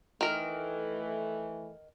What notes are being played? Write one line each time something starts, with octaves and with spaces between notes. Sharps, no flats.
D#3 E3 A3 A#4